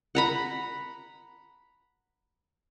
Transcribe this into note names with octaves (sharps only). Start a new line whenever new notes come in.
F#5 A#5 B5